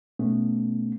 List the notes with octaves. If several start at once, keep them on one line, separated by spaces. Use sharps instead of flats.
B2 A3 B3 C#4